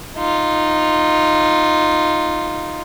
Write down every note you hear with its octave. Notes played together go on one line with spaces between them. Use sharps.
D#4 F4